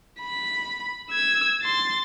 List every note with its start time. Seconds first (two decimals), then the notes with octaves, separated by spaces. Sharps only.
0.21 B5
1.11 E6 G#6
1.62 C6 A6